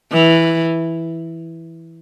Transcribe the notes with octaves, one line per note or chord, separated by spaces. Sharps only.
E3